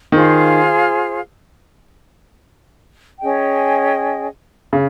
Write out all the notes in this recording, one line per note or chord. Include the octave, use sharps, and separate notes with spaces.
D#3 F4 G#4 C5 F5
C#4 G#4 D#5 G5
C#3